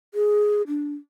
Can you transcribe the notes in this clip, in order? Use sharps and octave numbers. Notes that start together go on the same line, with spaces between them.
G#4
D4